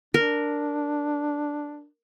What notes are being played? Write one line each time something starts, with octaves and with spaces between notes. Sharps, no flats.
D4 A#4